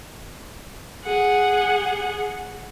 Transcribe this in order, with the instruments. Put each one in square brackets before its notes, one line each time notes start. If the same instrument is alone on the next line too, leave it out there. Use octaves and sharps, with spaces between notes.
[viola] G#4 F#5